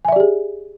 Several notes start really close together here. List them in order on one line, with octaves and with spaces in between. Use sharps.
G#5 E5 D5 G4 G#4